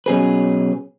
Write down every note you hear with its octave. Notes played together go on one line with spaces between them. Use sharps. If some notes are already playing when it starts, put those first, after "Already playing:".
B2 F#3 C#4 G#4 B4